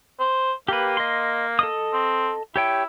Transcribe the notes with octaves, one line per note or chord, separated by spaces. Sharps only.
C5
A#3 G4 B4
D#5 C6
A4 D#5 D#6
C4
E4 G4 C#5 G5